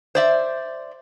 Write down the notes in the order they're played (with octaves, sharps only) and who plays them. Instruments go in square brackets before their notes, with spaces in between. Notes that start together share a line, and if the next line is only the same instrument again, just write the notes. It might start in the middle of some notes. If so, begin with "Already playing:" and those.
[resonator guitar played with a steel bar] C5 D5 E5